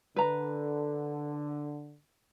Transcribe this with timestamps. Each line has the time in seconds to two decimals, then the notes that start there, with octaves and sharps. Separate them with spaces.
0.16 D3 B4 A#5